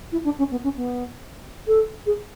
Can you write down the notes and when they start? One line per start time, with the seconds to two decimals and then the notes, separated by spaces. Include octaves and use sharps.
0.12 E4
0.24 D4
0.38 C#4
0.51 B3
0.63 C#4
0.76 B3
1.67 A4
2.06 G#4